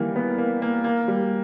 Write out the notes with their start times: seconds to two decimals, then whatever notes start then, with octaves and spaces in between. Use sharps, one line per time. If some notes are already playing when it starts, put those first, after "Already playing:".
Already playing: D#3 E3 G3 A#3
0.16 B3
0.38 A#3
0.62 A#3
0.84 A#3
1.08 G3